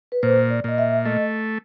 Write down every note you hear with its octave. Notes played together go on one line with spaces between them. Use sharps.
B4
A#2 C5
D5
A#2 D#5
E5
A3 D#5